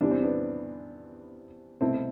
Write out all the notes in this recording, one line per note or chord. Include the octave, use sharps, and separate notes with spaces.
E2 C3 E3 G3 D4
C4
B3 D4
C2 B2 A3 C4 E4